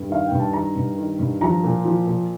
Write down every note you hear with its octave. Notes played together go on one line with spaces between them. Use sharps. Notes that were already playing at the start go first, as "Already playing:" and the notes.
Already playing: G2
D#3 F5
G5
G2
A5
D#3 A#5
G2
D#3
G2
F3 A#5
A#2
F3
A#2